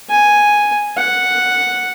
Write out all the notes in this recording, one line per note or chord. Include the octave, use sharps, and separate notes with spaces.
G#5
F#5